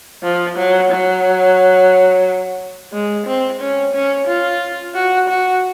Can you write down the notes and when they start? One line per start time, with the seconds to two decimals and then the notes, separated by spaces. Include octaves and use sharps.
0.23 F3
0.57 F#3
0.91 F#3
2.93 G#3
3.27 C4
3.60 C#4
3.94 C#4
4.27 F4
4.95 F#4
5.28 F#4